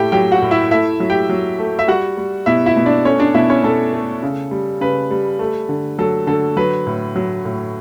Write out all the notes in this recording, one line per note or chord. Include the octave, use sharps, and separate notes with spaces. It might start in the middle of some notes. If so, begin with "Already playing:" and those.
Already playing: A2 A3 E4 G4 G5
F#3 G4 G5
F#4 F#5
A2
E4 E5
A3 E4 E5
F#3
G4 G5
F#3
A3
E5
G3 F#4 F#5
G3
B2 E4 E5
E4 E5
B2
D4 D5
A3 C#4 C#5
D4 D5
B2 E4 E5
C#4 C#5
B2 A4
A3
C#3
G3
C#3 B4
G3
A3
D3
F#3 A4
D3 A4
F#3 B4
A2
F#3
A2